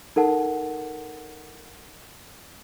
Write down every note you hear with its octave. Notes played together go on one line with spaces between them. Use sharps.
D#4 A4 A#4 F#5 A5